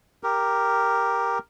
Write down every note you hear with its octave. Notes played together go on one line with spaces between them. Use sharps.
G4 A#4